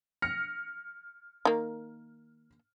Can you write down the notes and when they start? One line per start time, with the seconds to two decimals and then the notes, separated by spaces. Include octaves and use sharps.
0.22 F6 A#6 C#7
1.45 D#3 A#3